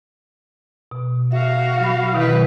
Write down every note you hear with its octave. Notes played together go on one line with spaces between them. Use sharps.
B2
F#4 E5 F5
F#3 B5
B2 D#3 F#3 E4 B4